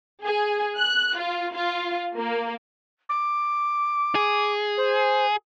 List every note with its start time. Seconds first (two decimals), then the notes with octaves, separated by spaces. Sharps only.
0.23 G#4
0.78 F#6
1.19 F4
1.55 F4
2.17 A#3
3.09 D6
4.15 G#4
4.77 C5